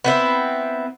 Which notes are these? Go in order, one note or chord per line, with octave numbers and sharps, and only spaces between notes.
B3 C4 E4